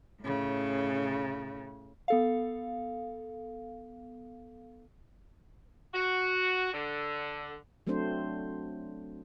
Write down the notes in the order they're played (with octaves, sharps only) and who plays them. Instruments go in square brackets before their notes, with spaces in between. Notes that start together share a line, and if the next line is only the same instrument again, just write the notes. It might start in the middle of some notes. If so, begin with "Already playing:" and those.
[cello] A2 C#3
[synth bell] B3 A4 F5
[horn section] F#4
D3
[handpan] F#3 A3 C4 D4 C5